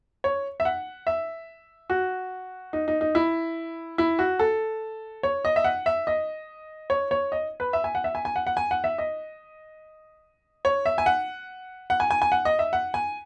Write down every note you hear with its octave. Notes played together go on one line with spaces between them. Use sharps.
C#5
E5
F#5
E5
F#4
D#4
D#4
D#4
E4
E4
F#4
A4
C#5
D#5
E5
F#5
E5
D#5
C#5
C#5
D#5
B4
E5
G#5
F#5
E5
G#5
G#5
F#5
F#5
G#5
F#5
E5
D#5
C#5
E5
G#5
F#5
F#5
G#5
G#5
G#5
F#5
D#5
E5
F#5
G#5